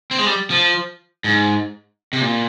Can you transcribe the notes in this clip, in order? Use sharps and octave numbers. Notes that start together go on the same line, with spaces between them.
C4
G#3
G3
F3
G#2
C3
A#2